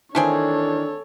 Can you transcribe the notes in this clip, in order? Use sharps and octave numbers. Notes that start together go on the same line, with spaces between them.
D#3 E3 A3 C4 D4 G#4 A4 C#5